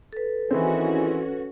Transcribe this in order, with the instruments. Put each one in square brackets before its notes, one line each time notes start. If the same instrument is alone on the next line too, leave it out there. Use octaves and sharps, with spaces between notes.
[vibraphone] A4 B4
[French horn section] D#3 E4 G#4 [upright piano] E3 C4 [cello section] C#4 F#4